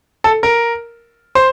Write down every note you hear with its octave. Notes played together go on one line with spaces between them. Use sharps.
A4
A#4
C5